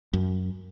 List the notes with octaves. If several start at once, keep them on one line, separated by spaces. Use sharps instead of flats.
F#2